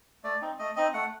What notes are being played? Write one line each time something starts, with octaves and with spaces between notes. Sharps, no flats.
A3 D5
C4 D#4
A3 D#5
C4 D#4 D#5
A3 F#5